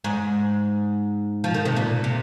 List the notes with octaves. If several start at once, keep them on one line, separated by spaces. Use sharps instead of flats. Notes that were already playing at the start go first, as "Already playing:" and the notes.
G#2
F3
D#3
C3
A#2
C3